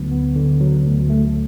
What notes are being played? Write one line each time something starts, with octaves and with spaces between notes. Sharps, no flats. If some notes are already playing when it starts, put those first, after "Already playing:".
Already playing: D2 D3 F#3 B3
B3
D3
F#3
D2
A3